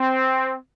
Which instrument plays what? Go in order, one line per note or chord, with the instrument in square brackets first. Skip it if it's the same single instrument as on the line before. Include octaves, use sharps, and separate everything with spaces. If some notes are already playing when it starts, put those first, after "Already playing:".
Already playing: [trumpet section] C4